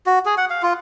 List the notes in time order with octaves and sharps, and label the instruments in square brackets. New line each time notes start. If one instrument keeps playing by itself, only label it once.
[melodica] F#4
G#4
F#5
F5
F4